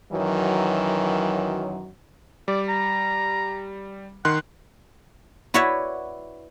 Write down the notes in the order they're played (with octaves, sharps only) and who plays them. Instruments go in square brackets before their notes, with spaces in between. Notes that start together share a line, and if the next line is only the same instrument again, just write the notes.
[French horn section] F#2 D#3 E3 F#3
[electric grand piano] G3 [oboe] D5
[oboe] A#5
[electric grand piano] D#3 C6 F#6 [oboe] F#5
[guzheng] E4 F#4 B4 C#5 D5 E5